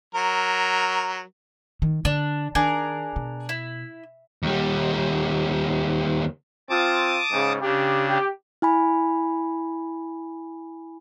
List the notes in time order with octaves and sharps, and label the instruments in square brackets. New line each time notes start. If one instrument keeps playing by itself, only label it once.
[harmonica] F#3 A#4
[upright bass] D#3
[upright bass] D3 [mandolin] D4
[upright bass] D#3 [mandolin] D4 G#4 A#4
[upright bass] B2
[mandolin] E4
[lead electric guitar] D#2 G3
[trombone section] C4 F4 [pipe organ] A5 D6 D#6
[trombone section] G#2 C#3
[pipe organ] C#3 D4 [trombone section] G4
[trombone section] G4
[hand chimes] E4 G#5 B5